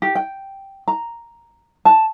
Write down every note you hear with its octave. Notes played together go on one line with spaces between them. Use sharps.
G4
G5
A#5
A5